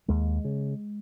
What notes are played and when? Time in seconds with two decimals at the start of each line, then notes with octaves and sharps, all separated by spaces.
0.08 D#2 G#3
0.45 C#3